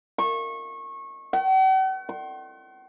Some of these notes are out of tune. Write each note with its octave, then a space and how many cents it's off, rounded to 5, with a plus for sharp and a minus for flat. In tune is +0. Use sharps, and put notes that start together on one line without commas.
C#6 -25
F#5 +45
C6 +35